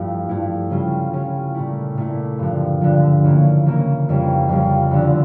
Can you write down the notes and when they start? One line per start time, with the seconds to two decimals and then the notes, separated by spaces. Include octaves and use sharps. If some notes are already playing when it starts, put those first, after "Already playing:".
Already playing: G2 F3 A3 E4
0.29 G2 F3 A3 E4
0.70 C#3 G3 C#4 F4
1.13 C#3 G3 C#4 F4
1.54 A#2 A3 E4
1.98 A#2 A3 E4
2.39 G2 D3 F3
2.81 G2 D3 F3
3.24 C#3 E3 A#3
3.66 C#3 E3 A#3
4.09 F2 C#3 G3
4.49 F2 C#3 G3
4.91 E2 D3 F3